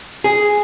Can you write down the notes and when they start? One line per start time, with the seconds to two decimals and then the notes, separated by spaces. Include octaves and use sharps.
0.24 G#4